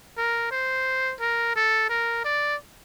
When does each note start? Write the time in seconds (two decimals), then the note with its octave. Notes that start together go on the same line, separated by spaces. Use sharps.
0.17 A#4
0.51 C5
1.21 A#4
1.56 A4
1.89 A#4
2.25 D5